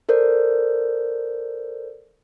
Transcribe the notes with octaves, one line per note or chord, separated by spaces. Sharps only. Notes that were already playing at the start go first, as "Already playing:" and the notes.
A4 A#4 C5 D5 G6